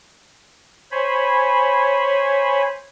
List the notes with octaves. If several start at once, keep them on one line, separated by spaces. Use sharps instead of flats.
C5 C#5 G#5 B5